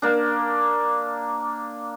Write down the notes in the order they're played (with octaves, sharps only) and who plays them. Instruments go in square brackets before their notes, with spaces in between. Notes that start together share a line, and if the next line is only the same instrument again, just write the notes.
[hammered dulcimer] A#3 D4